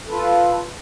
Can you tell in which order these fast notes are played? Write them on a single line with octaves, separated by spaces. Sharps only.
A4 B4 F4